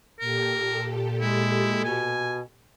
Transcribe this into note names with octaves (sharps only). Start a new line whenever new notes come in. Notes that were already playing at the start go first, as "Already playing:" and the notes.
A#2 G4 A4 A#4
G#3 E4
B2 G#5